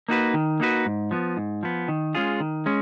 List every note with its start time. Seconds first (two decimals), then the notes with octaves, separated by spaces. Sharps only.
0.08 A#3 D#4 F#4 B4
0.34 D#3
0.60 A#3 D#4 F#4 B4
0.86 G#2
1.11 F3 B3
1.37 G#2
1.63 F3 B3
1.88 D#3
2.15 G#3 C#4 F4 G#4
2.40 D#3
2.66 G#3 C#4